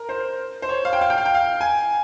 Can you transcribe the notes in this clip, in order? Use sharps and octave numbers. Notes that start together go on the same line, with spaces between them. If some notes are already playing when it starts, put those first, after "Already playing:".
Already playing: A#4
C5
C5
C#5
F5
G5
F5
G5
F5
G5
F5
G#5